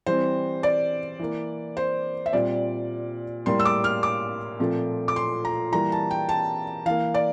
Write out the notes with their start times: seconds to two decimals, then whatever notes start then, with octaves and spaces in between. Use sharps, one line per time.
0.06 E3 G3 C4 C5
0.63 D5
1.19 E3 A#3
1.77 C5
2.26 E5
2.33 A#2 G3 C4 D5
3.46 A2 G3 A#3 C6
3.60 E6
3.65 D6
3.84 F6
4.03 D6
4.60 A#2 F3 A3 C4
5.08 D6
5.16 C6
5.45 A#5
5.72 E3 G3 A#3 A#5
5.92 A5
6.11 G5
6.29 A5
6.86 E3 A#3 F5
7.14 D5